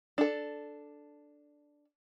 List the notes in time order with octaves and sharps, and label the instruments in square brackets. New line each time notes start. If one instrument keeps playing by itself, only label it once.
[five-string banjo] D4 A4